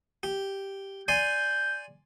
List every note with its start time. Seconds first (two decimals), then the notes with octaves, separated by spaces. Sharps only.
0.23 G4
1.08 D5 G#5 C6 G6